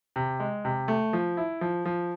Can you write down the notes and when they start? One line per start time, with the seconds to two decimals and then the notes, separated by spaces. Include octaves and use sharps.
0.16 C3
0.40 G#3
0.65 C3
0.88 A3
1.13 F3
1.37 E4
1.61 F3
1.85 F3